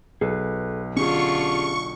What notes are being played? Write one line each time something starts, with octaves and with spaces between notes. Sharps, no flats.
B1 G#4 A4 B4
D3 C#4 F4 G4 G#4 C#6